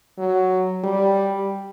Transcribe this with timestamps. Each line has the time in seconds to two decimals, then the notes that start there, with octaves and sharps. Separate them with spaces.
0.18 F#3
0.84 G3